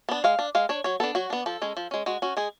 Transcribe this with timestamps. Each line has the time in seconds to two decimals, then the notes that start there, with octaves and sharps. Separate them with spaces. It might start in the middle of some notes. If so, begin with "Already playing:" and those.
0.09 B3 D4
0.24 G#3 F5
0.39 D4
0.55 G#3 F5
0.69 D4 C#5
0.84 F#3 C#5
1.00 B3 D4 A4
1.15 F#3 F#4
1.30 B3 D4
1.46 F3 A4
1.62 G#3 C#4
1.77 F3
1.91 G#3 C#4
2.06 G#3 F#4
2.22 C#4 F#4
2.37 G#3 G#4